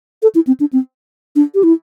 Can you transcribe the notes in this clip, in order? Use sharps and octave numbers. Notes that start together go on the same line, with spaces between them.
A4
E4
C4
D4
C4
D4
G4
E4